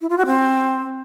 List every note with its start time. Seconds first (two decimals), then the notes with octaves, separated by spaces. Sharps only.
0.01 E4
0.10 F4
0.18 F#4
0.26 C4